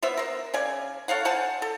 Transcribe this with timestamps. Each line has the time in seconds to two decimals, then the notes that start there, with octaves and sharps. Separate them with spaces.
0.03 B3 C5 E5
0.17 A#4 C5
0.54 C#3 D5 G#5
1.08 A4 C#5 F5 F#5
1.25 C5 F#5 G#5 A5
1.62 A4